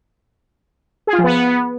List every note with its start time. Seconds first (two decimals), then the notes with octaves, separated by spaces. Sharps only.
1.07 G#4
1.13 F4
1.18 F3
1.24 B3